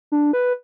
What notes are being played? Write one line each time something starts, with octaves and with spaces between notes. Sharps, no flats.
D4
B4